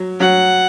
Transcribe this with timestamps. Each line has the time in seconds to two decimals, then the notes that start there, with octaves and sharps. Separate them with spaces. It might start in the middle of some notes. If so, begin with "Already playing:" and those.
Already playing: F#3
0.20 F#3 F#5